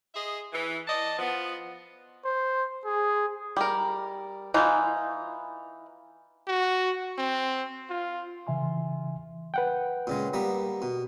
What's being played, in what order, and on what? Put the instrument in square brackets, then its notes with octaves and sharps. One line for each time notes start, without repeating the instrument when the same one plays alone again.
[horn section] G#4 D#5 E5 C6
E3
D5 D#5 A5
F3 B3
[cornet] C5
G#4
[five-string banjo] G3 A#4
E3 D#4 F4
[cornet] F#4
C4
F4
[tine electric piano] C#3 E3 E5 G#5 C6
[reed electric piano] B4 F#5 G5
[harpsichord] A#2 C#3 G#3
G3 A#3 B3
B2